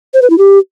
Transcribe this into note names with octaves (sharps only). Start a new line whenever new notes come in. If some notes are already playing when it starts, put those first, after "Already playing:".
C5
B4
E4
G4